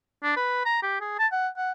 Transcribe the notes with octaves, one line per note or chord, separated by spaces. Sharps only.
D4
B4
A#5
G4
G#4
A5
F#5
F#5